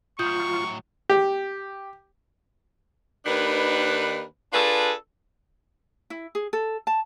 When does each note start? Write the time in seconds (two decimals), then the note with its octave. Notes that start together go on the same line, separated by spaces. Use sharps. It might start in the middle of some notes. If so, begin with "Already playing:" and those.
0.19 A2 F#3 F4 C#6 D#6 G6
1.09 G4
3.26 D#2 D#3 D4 B4
4.53 D4 F4 G#4 A4 B4
6.10 E4
6.35 G#4
6.53 A4
6.87 A5